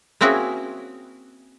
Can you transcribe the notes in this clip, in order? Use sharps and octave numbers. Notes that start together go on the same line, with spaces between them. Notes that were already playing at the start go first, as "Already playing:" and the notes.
A#3 C4 C#4 E4 F#4 G#4